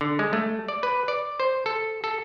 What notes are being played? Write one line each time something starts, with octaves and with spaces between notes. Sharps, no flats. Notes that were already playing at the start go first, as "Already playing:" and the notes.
D3
G#3
A3
D5
B4
D5
C5
A4
A4